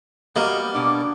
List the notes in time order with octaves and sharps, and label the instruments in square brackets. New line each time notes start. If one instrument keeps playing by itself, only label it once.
[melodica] G3 B3 [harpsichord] A#3 [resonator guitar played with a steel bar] F#4 G4 D#5
[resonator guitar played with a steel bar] B2 D5 [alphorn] D4